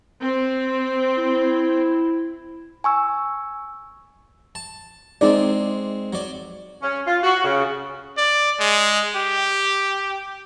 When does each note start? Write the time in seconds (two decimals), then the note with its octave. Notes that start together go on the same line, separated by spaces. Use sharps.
0.21 C4
1.17 E4
2.84 G#5 C#6 E6
4.55 A5
5.21 G#3 C4 D#4 D5
6.13 F#3 D5
6.82 C#4
7.06 F4
7.23 F#4
7.43 C#3
8.18 D5
8.60 G#3
9.16 G4